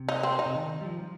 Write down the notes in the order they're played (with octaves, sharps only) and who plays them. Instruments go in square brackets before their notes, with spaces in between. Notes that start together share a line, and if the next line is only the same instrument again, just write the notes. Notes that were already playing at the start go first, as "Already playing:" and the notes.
Already playing: [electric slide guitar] C3
[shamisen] D#4
C4
D#4
[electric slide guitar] C3
D#3
G3
F3